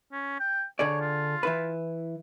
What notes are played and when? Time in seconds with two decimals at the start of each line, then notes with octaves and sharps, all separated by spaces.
0.12 C#4
0.39 G5
0.79 D3 G#4 C#5 D5
1.01 F4
1.43 E3 E4 B4